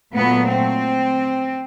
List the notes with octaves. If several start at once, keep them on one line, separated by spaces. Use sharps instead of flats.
A#2 F#3 A3 B3
C4